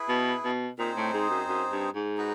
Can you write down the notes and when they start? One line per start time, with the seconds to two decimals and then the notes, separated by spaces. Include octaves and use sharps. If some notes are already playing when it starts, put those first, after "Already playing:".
Already playing: E4 G#4 B4
0.09 B2
0.45 B2
0.78 A#2 C4 D#4 G#4 C5
0.97 A2
1.14 G#2
1.30 F#2
1.48 F#2
1.72 G2
1.95 G#2
2.18 D#4 F#4 B4